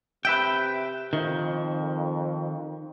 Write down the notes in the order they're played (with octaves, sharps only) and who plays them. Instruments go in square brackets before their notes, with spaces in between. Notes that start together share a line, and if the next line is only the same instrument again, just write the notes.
[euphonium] C3 [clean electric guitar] B4 E5 G5
[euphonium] F2 [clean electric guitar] D#3